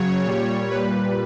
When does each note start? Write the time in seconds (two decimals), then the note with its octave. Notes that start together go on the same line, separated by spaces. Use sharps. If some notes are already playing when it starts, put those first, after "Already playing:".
Already playing: C#3 F#3 C#5
0.24 A#2 G3
0.70 A#2 G3 B4